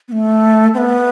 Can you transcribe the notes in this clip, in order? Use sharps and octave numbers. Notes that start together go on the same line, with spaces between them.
B3
A3
C4
B3